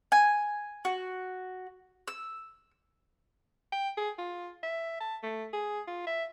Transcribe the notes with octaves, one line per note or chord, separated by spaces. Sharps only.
G#5
F#4
E6
G5
G#4
F4
E5
A5
A3
G#4
F4
E5